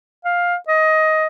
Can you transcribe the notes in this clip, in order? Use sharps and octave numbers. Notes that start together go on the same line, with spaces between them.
F5
D#5